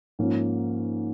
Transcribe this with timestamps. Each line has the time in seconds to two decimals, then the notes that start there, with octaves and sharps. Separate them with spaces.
0.19 G#2 F3 A#3 C#4